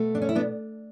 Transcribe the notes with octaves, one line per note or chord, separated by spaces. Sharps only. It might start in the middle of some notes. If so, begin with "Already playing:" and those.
Already playing: B2 A3
D4
C#4
E4
B3 D4